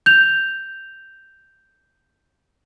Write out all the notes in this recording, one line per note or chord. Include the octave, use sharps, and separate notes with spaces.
G6 F7